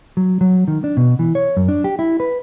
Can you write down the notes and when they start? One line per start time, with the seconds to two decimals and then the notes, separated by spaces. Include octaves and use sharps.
0.17 F#3
0.41 F#3
0.68 D#3
0.84 D4
0.97 B2
1.19 E3
1.35 C#5
1.57 F#2
1.68 D4
1.84 G4
1.99 E4
2.20 B4